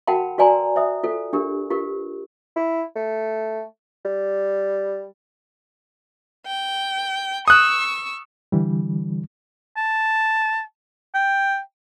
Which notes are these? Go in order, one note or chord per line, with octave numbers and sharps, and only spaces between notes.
F#4 A#4 F#5 G5 A5 B5
F#4 B4 D5 G#5 A#5 C6
C5 E5 D#6
F4 A4 C5
D4 G4 A#4
F4 G4 A#4 B4
E4
A3
G3
G5
C#6 D#6 E6 F#6
D3 E3 G3
A5
G5